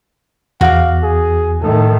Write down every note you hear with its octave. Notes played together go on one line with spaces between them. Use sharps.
E2 F#4 F5 D6
G#4
A2 D#3 A4